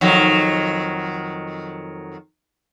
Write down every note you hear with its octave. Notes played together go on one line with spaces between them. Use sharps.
F2 D#3 F#3